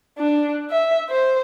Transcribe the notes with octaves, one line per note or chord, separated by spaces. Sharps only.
D4
E5
C5